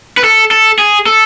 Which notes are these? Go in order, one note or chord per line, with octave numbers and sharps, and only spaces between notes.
B4
A4
A4
G#4
A4